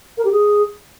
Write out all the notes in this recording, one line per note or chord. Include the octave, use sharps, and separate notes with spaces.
A#4
G4
G#4